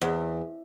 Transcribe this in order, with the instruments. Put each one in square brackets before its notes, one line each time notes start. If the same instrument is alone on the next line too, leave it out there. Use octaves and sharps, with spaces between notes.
[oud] E2